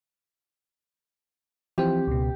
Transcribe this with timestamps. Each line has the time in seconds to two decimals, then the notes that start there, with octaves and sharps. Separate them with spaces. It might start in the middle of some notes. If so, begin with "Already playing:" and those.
1.78 E3 F3 C4 G4
2.07 C#2 B2